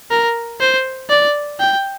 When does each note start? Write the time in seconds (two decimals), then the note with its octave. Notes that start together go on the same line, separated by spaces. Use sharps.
0.10 A#4
0.60 C5
1.10 D5
1.60 G5